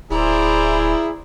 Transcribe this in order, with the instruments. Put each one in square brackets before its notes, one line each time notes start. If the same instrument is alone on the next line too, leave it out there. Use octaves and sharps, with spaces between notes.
[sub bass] D1 [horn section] E4 G#4 [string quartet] C5 D5 A#5